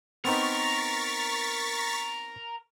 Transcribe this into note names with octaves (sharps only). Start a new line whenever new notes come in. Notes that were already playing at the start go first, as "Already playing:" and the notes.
B3 C4 D#4 A#4 C#6 A6 B6